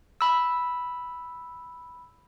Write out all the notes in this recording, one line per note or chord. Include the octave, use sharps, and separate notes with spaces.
B5 E6